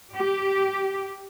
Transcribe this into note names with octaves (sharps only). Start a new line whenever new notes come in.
G4